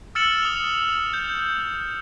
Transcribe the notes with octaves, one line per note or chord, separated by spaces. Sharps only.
E6 F6 A6 C#7 E7 F#7
D#6 F7
G6